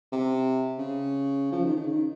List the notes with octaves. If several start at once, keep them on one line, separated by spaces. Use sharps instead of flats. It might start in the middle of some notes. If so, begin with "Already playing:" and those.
C3
C#3
F3
D#3
C#3
D#3